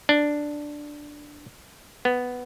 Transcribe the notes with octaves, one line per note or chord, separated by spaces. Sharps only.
D4
B3